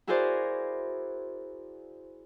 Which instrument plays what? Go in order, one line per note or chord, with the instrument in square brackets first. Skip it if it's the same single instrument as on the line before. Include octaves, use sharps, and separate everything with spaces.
[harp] E4 F#4 G#4 A#4 C5 D5